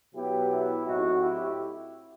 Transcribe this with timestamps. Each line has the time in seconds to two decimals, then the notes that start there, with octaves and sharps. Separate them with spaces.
0.14 B2 F#3 B3 E4 G4
0.49 E4 G4
0.84 A2 F#3 C4 D#4 F#4
1.20 E4 G4